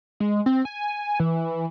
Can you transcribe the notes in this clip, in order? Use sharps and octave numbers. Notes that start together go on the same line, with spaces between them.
G#3
C4
G#5
E3